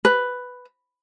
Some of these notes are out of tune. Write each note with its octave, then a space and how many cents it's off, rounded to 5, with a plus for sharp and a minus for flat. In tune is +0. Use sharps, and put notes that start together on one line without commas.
B4 +5